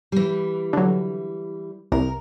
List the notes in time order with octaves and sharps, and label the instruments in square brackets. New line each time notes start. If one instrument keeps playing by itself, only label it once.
[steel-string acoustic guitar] E3 G3
[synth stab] D3 F#3
[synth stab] C2 [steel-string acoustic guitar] A#4